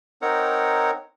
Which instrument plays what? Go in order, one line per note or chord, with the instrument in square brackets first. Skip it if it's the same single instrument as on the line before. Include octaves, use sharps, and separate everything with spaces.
[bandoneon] C4 D#4 A#4 C#5 F#5